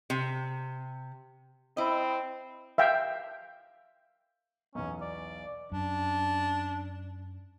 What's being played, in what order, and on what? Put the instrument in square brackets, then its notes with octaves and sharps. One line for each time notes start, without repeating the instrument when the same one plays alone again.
[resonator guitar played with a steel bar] C3
[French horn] C4 [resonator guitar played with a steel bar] E4 D#5
[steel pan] E5 F5 G5
[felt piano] B1 E2 [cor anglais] C#4
[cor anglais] D5
[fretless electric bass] F#2 [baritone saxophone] D4